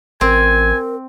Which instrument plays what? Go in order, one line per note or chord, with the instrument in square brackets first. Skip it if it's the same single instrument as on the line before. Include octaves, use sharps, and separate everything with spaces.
[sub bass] A1 [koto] C4 [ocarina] A#4 [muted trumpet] G#5